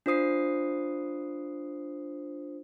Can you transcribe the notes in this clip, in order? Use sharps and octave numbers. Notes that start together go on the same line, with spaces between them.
D4 F4 C5 D#6 C7